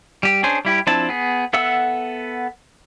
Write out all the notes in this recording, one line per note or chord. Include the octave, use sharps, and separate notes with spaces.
G3 G4
C#4 D4 G#4 C5
G3 E4 G4
F3 C4 D4 E4 A5
B3 G#4
B3 A4 E5 F#5 E6